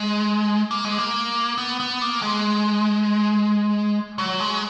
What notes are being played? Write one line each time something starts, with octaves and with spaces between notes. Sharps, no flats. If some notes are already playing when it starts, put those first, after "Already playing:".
Already playing: G#3
A#3
G#3
A#3
B3
B3
A#3
G#3
F#3
G#3